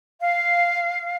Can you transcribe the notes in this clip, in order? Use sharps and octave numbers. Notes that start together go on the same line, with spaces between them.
F5